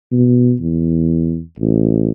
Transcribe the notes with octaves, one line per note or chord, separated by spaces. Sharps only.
B2
E2
A1